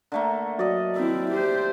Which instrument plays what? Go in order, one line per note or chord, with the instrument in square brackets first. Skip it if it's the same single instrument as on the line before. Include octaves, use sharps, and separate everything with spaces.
[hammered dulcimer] D3 A3 A#3
[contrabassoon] F#3 [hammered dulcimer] D5 D#5
[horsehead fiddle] C4 E4 [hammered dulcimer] E5
[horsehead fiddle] G4 C5